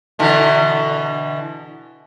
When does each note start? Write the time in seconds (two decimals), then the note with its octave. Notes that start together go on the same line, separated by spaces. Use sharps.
0.19 B2 D3 E3